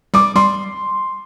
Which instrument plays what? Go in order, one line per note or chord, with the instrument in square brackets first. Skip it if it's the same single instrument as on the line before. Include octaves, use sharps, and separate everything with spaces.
[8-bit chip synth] G3 [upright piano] D6
[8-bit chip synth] G3 [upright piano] C6